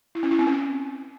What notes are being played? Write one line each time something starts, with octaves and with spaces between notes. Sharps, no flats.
E4
C#4
E4
C4
C#4